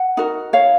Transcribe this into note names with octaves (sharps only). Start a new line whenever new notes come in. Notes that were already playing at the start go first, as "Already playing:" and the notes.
Already playing: F#5
D#4 F#4 A#4
C#5 F5